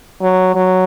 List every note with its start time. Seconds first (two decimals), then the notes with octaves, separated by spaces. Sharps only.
0.21 F#3
0.55 F#3